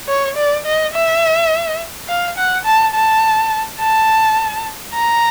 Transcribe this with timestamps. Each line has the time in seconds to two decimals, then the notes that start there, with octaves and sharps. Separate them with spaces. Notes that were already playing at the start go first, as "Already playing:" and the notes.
0.08 C#5
0.37 D5
0.66 D#5
0.94 E5
2.09 F5
2.37 F#5
2.65 A5
2.94 A5
3.79 A5
4.94 A#5